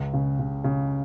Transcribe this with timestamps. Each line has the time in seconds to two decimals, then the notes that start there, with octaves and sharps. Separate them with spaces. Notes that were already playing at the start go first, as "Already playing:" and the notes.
Already playing: C#2
0.14 C#3
0.39 C#3
0.64 C#3